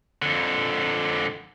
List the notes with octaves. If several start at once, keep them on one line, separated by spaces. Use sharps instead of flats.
F2 D3